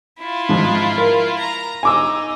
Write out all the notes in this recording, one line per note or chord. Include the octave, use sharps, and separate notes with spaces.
E4 F4
G#2 F3
A#4
A#5
D#4 G#5 D6 E6